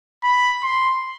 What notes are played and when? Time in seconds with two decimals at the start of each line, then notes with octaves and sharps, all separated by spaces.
0.23 B5
0.63 C6